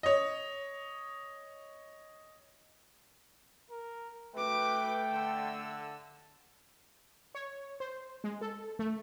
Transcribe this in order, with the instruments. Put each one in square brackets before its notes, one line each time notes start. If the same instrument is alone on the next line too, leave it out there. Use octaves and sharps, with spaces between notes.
[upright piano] C#5 D#5
[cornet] A#4
[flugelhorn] A3 [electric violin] F#4 D6 [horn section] B4 [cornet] G5
[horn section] D3 [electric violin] E6
[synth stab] C#5
C5
G#3
A4
A3